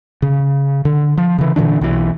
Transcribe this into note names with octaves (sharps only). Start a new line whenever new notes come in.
C#3
D3
F3
C#3 E3
A#2 D3 E3 D4
B1 E3